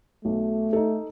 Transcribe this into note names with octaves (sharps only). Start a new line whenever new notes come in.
B1 A3
D#4 A4